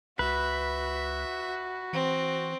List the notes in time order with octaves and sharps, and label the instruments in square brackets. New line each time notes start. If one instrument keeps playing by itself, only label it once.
[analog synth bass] C#2 [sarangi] F#4 [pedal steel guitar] B4 [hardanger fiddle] E5
[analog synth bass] E3 [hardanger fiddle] C4